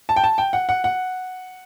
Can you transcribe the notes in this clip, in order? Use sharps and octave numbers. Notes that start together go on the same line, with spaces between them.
A5
G5
A5
G5
F#5
F#5
F#5